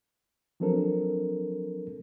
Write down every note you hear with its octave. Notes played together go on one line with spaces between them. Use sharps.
F3 F#3 C4 D4 A4 A#4